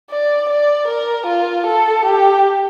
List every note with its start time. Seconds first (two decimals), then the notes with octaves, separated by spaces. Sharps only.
0.10 D5
0.49 D5
0.88 A#4
1.27 F4
1.67 A4
2.05 G4